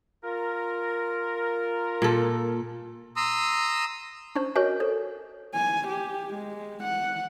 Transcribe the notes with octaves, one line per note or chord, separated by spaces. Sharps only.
F4 A#4
A#2 A4
A#5 C6 D#6 E6
C#4 D4 C5 C#6
F#4 A#4 C#5 D#5 G#5
A4 C5
G#5
G4
G#3
F#5